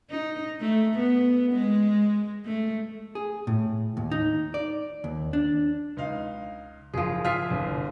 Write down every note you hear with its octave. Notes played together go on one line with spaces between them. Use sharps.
D#4
A3
B3
G#3
A3
G#4
A2
D#2
D#4
D5
D#2
D4
C#2 D#4 F5
F#1 F3 G#4
F4 G#4 E5 F6 B6 C7
G1 C2